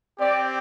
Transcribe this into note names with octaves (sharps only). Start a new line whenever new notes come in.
C4 G4 D5